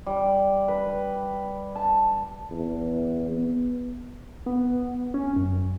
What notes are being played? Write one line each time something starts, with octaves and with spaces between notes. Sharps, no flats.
G3
B4
A5
E2
B3
B3
C#4
F#2